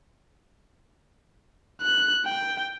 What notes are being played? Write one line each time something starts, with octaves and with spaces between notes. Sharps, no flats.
F#6
G5